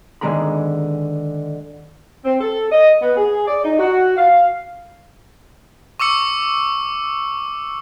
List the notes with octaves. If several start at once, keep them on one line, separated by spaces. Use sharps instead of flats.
D3 D#3 G#3 G#4 A#5 B5
C4
A4
D#5
B3
G#4
D5
D#4
F#4
F5
C#6 D6 E6 C#7